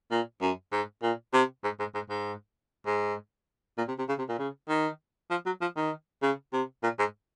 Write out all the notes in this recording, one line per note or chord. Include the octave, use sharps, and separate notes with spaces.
A#2
F#2
G#2
A#2
C3
G#2
G#2
G#2
G#2
G#2
A#2
C3
C3
C#3
C3
A#2
C#3
D#3
F3
F#3
F3
D#3
C#3
C3
A#2
G#2